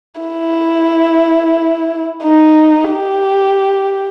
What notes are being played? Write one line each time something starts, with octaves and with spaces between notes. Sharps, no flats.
E4
D#4
G4